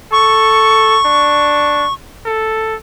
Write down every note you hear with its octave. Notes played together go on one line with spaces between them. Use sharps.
A4 C#6
D4
A4